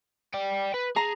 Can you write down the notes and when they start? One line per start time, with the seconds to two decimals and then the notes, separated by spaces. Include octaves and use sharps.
0.34 D5 G5
0.74 B4
0.96 G#4 A#5